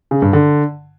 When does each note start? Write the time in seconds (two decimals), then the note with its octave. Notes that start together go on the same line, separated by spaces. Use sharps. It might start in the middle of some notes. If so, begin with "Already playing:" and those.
0.11 C#3
0.22 G2
0.33 D3